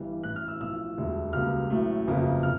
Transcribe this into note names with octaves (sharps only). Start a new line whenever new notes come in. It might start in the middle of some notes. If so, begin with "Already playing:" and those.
Already playing: G1 G2 E3 G3
A1 A2 E3 F#6
F6
E6
B1 A2 F3 A3 E6
E1 D2 D3 G3
C#2 B2 G3 A#3 F6
A1 A2 F#3 A3
G1 F2 C#3 F#3 A#3
C3 F6